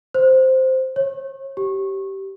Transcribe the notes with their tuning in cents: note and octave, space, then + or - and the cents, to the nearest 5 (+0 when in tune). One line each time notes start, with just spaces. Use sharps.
C5 -5
C#5 -35
G4 -15